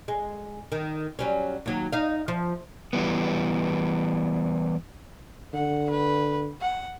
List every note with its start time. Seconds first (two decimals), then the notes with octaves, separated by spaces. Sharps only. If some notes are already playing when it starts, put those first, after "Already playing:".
0.08 G#3
0.72 D#3
1.19 F#3 G3 C#4
1.66 D#2 F#3
1.92 D#4 F5
2.28 F3
2.93 E3 G3 B3
5.54 D3 F#5
5.90 B4
6.61 F#5